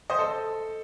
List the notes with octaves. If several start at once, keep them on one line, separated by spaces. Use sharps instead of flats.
C5 D#5
A4